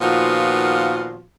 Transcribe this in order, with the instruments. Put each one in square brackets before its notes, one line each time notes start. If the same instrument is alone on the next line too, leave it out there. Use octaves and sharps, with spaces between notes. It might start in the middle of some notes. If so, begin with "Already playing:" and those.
[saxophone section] A#2 D#3 F3 B3 F4 F#4